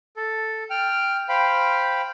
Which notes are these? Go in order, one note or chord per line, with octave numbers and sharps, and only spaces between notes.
A4
G5 F6
C5 F5 G5 B5